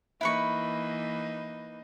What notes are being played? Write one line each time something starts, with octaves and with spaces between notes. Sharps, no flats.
E3 A#3 D#4 E4 B4 C#6